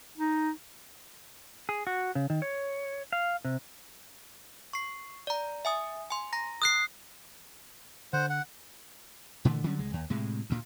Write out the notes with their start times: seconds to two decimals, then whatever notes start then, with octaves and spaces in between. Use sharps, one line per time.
0.17 D#4
1.69 G#4
1.87 F#4
2.15 C#3
2.30 D#3
2.42 C#5
3.13 F5
3.45 C3
4.73 C#6 C7
5.27 D5 A#5
5.65 E5 G#5 D#6
6.10 G#5 C6
6.33 A#5 A#6
6.62 D#6 F#6 C7
8.13 D3 C5 F#5
8.30 F#5
9.45 A#2 D3 E3 A3
9.64 D3 F#3 G3 C#4
9.79 C2 G#3
9.94 D#2
10.10 A2 C3 G#3
10.50 D2 A#2